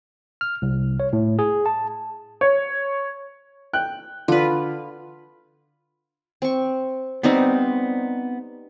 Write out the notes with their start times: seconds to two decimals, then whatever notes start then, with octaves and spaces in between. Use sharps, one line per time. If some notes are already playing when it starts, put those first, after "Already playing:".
0.41 F6
0.62 C2
1.00 C#5
1.13 A2
1.39 G#4
1.66 A5
2.41 C#5
3.73 G5 F#6
4.28 D3 F4 B4
6.42 C4 C#6
7.23 G3 B3 C4 D#4 C5